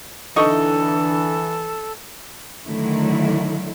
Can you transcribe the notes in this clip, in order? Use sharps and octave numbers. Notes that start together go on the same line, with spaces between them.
D3 E3 D#4 A4 D#5 C#6
D3 D#3 F#3 A3 E4